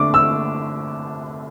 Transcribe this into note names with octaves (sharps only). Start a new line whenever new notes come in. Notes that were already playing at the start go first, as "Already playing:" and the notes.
Already playing: D3 A3 D4 D6
E6